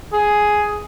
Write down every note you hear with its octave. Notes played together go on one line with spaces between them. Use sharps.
G#4